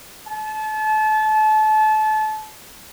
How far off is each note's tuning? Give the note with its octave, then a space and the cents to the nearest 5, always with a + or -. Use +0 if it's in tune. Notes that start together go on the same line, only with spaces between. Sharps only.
A5 -30